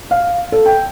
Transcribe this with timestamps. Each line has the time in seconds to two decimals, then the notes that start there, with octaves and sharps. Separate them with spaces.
0.11 F5
0.52 A4
0.66 G5